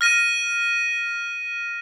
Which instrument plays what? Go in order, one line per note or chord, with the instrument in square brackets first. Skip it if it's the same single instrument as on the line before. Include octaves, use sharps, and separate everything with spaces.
[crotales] F6 A#6 D#7